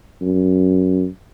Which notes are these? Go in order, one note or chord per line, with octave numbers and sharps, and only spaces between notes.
F#2